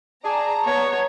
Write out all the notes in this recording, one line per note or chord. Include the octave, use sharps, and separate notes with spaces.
G#4 D5 A5 A#5
B3 C#5